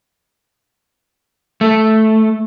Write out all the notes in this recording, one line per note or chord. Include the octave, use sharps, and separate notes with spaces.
A3